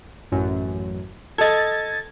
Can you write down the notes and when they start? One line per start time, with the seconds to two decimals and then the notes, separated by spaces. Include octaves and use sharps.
0.32 A1 F#2
1.38 A4 D#5 G#6 A6